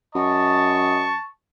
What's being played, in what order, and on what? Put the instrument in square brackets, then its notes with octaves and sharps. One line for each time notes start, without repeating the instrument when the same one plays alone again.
[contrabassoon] F#2 [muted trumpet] D#5 [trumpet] A5 [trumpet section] C#6